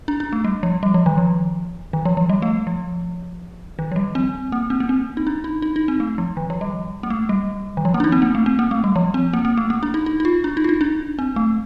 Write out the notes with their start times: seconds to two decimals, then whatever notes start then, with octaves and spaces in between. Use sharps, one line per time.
0.08 D4
0.20 D4
0.33 A3
0.45 G3
0.63 F3
0.83 G3
0.94 F3
1.06 D#3
1.18 F3
1.93 D#3
2.05 F3
2.17 F3
2.29 G3
2.42 A3
2.67 F3
3.79 D#3
3.92 F3
3.96 G3
4.15 C4
4.52 A#3
4.70 C4
4.80 A#3
4.89 C4
5.17 D#4
5.27 D4
5.44 D#4
5.62 D#4
5.76 D#4
5.88 C4
6.00 A3
6.18 F3
6.37 D#3
6.50 F3
6.61 G3
7.03 A#3
7.10 A3
7.29 G3
7.77 D#3
7.85 F3
7.94 A#3
8.00 D4
8.04 D#4
8.12 C4
8.22 A#3
8.35 A3
8.46 C4
8.59 A#3
8.71 A3
8.84 G3
8.96 F3
9.14 C4
9.33 A#3
9.45 A#3
9.58 A3
9.70 A#3
9.83 D4
9.94 D#4
10.06 D#4
10.20 D#4
10.25 F4
10.44 D4
10.57 D#4
10.64 F4
10.69 D#4
10.81 D4
11.19 C4
11.36 A3